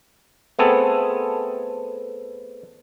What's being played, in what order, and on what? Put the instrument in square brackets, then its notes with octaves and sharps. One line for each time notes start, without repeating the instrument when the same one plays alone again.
[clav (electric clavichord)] A3 B3 C4 G#4 A4